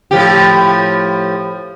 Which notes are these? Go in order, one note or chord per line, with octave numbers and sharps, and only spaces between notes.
A2 F3 G4